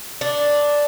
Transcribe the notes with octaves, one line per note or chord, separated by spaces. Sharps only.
D4